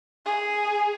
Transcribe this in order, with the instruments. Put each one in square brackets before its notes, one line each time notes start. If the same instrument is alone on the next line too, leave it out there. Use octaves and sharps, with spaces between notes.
[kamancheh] G#4